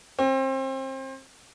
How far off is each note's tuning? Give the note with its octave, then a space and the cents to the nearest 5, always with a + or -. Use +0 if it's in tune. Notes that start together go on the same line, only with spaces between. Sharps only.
C4 +30